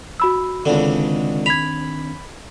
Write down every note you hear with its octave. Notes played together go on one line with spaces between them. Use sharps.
F#4 B5 E6
C#2 D3 D#3 C4 D4
B5 G#6 F7